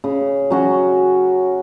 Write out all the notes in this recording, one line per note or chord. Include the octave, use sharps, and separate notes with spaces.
C#3
F#3 C#4 F#4